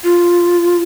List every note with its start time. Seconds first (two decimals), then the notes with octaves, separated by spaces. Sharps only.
0.04 F4